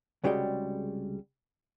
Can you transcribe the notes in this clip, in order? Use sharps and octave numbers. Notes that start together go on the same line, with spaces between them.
C2 C#3 G3 G#3 F#4 G5